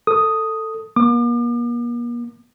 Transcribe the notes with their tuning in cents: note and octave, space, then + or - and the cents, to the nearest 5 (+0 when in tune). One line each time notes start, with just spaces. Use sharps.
A4 +10 D#6 +0
A#3 +40 D6 +40